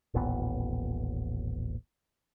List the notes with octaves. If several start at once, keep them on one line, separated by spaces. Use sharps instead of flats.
D#1 A1 A#2 B3